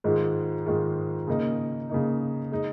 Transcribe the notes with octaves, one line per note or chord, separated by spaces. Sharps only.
G#2 D#3 G#3 F4
G#2 D#3 G#3 F4
C#3 A#3 D#4
C#3 A#3 D#4
G#3 D#4